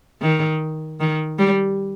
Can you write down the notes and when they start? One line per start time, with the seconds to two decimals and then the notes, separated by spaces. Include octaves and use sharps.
0.22 D#3
1.00 D#3
1.39 G3